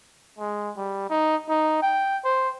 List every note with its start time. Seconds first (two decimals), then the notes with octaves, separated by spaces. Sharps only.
0.39 G#3
0.77 G3
1.10 D#4
1.49 D#4
1.82 G5
2.24 C5